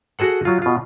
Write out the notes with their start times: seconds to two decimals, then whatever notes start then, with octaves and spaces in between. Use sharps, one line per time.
0.19 F#4 G#4 A4 F#5
0.45 F#3 F4
0.62 B2 F4